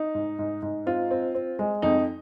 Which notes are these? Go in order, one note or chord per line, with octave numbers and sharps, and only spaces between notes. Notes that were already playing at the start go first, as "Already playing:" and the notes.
Already playing: D#4
G#2
G#2
G#2
C4 F4
C4
C4
G#3
F2 D#4